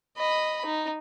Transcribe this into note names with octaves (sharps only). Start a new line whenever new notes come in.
D#5 B5
D#4